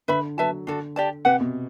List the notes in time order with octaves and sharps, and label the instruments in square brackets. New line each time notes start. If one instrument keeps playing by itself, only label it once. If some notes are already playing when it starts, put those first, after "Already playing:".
[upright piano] D3 [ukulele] B4 E5 B5
[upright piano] F#3 [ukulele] B4 E5 A5
[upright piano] D3 [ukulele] D4 F#4 A4
[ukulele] G4 D5 A5
[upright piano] C3 [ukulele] G4 B4 F#5
[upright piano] B2